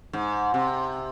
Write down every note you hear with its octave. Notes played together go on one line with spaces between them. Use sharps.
G#2
C3